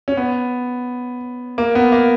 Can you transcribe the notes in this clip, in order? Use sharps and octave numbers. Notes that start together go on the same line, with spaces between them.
C#4
B3
A#3
B3
A#3